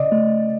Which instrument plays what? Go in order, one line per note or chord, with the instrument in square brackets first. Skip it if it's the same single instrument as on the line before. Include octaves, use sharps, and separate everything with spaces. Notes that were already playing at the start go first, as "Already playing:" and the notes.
Already playing: [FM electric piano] C#3 [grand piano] D5 D#5
[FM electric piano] A3